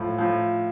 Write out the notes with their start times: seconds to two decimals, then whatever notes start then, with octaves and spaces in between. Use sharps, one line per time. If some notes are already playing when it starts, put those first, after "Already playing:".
Already playing: A2 F3
0.19 A2 F3